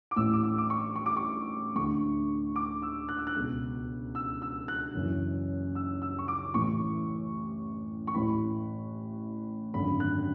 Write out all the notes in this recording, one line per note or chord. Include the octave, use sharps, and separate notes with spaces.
D6
A1 A2 E3 E6
D6
E6
D6
C#6
C#6
D6
C#6
D2 D3 C#6
D6
E6
F#6
E6
F#6
C#2 B2
E6
E6
F#6
F#1 F#2 E3
E6
E6
C#6
D6
A1 A2 E3 C#6
C#6
A1 A2 E3 B5
G#1 F#2 D3 B5
F#6